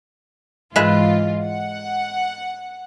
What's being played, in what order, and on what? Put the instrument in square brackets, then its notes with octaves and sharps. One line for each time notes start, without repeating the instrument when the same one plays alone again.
[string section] G#2 E3 F4 [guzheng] G#3 B4 E5
[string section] F#5